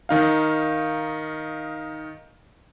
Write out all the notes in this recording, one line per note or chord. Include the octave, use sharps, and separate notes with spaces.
D#3 D#4 F5